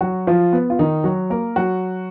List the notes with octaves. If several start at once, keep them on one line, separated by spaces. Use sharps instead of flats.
F#3 F#4
F3 F4
B3
F4
D#3 D#4
F#3 F#4
A#3 A#4
F#3 F#4